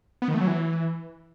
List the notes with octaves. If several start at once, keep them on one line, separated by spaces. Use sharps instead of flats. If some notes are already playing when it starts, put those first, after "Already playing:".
B3
D#3
A3
F#3
E3